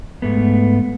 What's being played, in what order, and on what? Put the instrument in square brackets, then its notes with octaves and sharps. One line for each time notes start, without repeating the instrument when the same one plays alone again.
[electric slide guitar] G#2 A3 B3